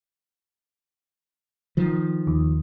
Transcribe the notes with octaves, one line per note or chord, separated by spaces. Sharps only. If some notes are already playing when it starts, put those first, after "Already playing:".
D#3 F3
D#2